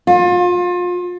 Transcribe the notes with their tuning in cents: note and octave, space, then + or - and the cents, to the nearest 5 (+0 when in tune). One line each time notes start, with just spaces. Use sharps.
F4 +30